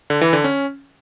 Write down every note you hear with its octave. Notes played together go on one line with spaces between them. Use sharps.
D3
E3
D3
C#4